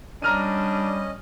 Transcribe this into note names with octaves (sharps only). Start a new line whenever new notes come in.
G3 C#4 D4 D#5 A#5 F6 D#7